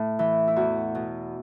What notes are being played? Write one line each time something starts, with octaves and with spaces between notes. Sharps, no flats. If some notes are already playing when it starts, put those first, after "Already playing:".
Already playing: A2
E3
E4
E2 F#4
B2